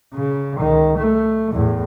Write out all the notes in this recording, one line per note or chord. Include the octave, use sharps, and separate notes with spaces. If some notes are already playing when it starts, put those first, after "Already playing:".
C#3
C#2 D#3
A3
E2 A2